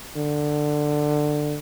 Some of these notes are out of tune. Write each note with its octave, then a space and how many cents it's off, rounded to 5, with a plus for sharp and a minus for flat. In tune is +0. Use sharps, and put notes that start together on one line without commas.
D3 +15